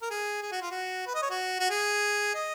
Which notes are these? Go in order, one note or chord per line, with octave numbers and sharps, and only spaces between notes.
A#4
G#4
G#4
F#4
F4
F#4
B4
D#5
C#5
F#4
F#4
G#4
D#5